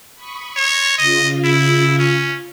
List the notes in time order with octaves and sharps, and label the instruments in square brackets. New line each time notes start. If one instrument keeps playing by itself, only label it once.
[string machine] B5 C#6 D#6
[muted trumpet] C#5 [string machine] C6 A6 A#6
[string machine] C#3 F4 [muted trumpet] D#5
[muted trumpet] E4
C#4